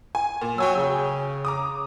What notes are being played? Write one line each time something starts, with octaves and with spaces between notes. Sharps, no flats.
G#5
A#2
F#3 G5 G#5 E6
C#3
A#5 D6 D#6